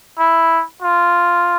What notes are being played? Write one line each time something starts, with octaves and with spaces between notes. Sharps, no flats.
E4
F4